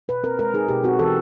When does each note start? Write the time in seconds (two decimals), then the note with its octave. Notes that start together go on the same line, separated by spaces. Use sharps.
0.08 B2 B4
0.23 C4 A#4
0.39 G#3 A#4
0.54 D#4 G#4
0.69 B2 G4
0.84 C4 F#4
0.99 E3 A4